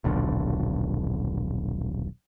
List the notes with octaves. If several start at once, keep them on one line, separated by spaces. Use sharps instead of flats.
D#1 B1 D3